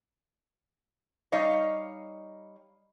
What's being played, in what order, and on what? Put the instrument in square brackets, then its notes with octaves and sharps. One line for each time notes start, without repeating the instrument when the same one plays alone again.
[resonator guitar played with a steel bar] G3 D#4 C#5 D#5 F5